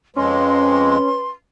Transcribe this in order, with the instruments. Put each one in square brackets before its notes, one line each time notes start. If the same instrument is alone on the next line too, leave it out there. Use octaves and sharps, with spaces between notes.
[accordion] F2 G#3 [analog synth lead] C#4 [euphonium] B4 [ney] C6